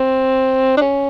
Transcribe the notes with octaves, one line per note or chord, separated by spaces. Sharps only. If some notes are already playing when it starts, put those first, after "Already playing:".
Already playing: C4
D4
C#4